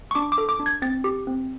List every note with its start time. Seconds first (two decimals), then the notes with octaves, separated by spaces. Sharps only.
0.11 C#6
0.15 D4 D6
0.32 D6
0.38 A4
0.49 D6
0.60 D4
0.66 G#6
0.82 C4 A6
1.04 G4
1.27 C4